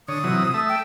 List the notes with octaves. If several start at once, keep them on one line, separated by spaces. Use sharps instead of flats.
D3 C#5 D#6
C3 E3 F#3
A3 E5
G5